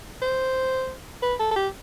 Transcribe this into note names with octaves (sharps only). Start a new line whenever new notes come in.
C5
B4
A4
A4
G4